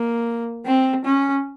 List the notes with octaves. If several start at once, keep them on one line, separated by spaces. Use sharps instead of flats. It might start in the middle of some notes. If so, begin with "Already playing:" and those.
Already playing: A#3
C4
C#4